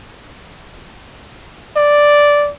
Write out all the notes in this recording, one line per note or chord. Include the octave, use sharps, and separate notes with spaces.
D5